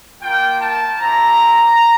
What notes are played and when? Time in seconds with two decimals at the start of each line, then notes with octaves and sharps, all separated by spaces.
0.22 A#3 F4 G5
0.61 A5
0.99 C4 E4 G4 A#5